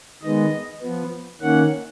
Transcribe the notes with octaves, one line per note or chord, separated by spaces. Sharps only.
D#3 G#3 B3 D#5
F3 B3
D#3 A#3 C#4 F#5